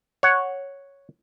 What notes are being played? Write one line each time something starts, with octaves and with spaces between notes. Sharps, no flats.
C#5 F#5